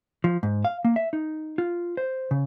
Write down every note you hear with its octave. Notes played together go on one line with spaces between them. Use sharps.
F3
G#2
F5
A#3
E5
D#4
F4
C5
C#3